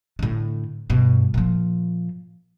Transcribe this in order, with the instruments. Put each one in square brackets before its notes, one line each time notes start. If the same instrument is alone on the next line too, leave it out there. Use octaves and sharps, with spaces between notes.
[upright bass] A2 D3
G2 B2
A#2 F3